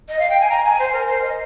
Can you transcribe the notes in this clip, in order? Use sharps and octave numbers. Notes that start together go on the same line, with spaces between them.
D#5
F5
G5
G#5
A#5
G#5
C5
A#4
C5
D#5